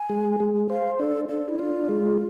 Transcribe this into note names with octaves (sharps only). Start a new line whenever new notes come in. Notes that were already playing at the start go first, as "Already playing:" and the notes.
Already playing: G#5
G#3
G#3
C5 F5
D4 A4
D4 A4
E4
D4 F4
G#3